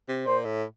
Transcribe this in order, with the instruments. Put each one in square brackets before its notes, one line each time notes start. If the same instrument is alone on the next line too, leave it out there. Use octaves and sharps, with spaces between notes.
[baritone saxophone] C3
[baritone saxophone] A#2 [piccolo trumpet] C5
[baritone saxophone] A2